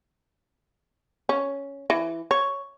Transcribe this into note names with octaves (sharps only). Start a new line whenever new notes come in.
C#4
E3
C#5